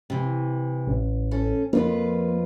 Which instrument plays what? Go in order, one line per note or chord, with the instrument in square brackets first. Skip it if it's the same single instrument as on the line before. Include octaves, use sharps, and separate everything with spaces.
[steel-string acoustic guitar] C3 E3
[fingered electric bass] A1
[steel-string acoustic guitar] C#4 A4
[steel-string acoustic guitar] F2 F4 B4 [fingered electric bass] A#3